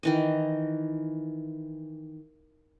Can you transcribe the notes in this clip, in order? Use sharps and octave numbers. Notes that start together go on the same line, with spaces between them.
D#3 E3 D#5